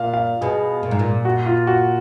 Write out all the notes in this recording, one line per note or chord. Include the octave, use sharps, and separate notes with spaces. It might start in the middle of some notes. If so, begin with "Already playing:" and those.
Already playing: A#2 F5
F5
B2 G#4
A#2
G#2
A#2
F#4
F4
F#4